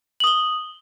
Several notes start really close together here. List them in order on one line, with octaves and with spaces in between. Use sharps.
F#7 D#6 G7